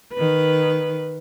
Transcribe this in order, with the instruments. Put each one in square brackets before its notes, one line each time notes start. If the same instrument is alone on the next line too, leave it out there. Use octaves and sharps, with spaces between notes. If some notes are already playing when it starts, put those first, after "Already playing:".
[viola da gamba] D#3 B4